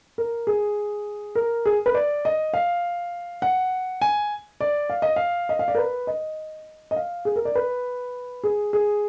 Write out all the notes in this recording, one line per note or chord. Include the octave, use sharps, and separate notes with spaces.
A#4
G#4
A#4
G#4
B4
D5
D#5
F5
F#5
G#5
D5
F5
D#5
F5
D#5
F5
D5
A#4
B4
D#5
D#5
F5
G#4
A#4
D5
B4
G#4
G#4